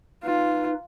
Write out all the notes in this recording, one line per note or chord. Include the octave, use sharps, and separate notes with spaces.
D#4 F4 B4